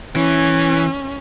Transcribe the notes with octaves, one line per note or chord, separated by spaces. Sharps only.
E3 C#4